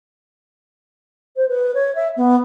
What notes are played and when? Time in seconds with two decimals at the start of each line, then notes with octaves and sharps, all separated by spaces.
1.36 C5
1.48 B4
1.74 C#5
1.95 E5
2.16 B3